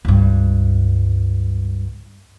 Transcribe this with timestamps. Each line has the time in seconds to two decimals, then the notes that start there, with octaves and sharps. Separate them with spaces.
0.05 C#2 G2